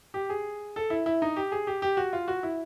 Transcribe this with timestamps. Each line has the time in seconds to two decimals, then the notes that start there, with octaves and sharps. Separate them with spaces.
0.14 G4
0.30 G#4
0.76 A4
0.90 E4
1.06 E4
1.22 D#4
1.36 G4
1.52 G#4
1.67 G4
1.82 G4
1.97 F#4
2.13 F4
2.28 F#4
2.43 E4